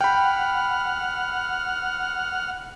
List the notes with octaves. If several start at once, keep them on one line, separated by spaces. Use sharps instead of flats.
F#5 G5 B5 F6